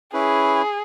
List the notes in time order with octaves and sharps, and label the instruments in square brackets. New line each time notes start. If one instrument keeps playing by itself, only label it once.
[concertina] C#4 E4 B4 [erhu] G#4